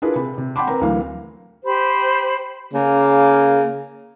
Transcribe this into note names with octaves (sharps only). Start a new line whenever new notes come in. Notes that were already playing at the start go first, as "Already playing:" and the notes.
D4 E4 F4 G#4 A#4 B4
C3 B5
C3
F#5 G5 A5 B5 C6 D6
C4 A#4 B4 A#5
D2 E3 F#3 A#3 F5
G4 C5 B5
C#3 A#3